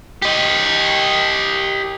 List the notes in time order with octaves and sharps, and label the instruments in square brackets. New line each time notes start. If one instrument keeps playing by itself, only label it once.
[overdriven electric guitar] G4 D#5